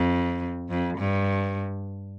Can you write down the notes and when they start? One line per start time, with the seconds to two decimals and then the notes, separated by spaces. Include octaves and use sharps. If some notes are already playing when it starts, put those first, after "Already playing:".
Already playing: F2
0.70 F2
0.98 G2